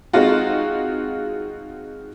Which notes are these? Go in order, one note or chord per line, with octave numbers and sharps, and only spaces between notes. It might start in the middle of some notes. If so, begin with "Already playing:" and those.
G#3 C4 D#4 F4 F#4